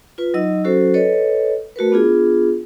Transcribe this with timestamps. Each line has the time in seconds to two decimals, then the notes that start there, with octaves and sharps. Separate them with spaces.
0.18 F4 B4
0.34 F#3 D#4 D#5 E6
0.64 F#3 C#4 F#4 A4 C5
0.94 A4 B4 C#5 D#5
1.76 A3 F#4 A#4 B4
1.92 B3 D4 F4 G#4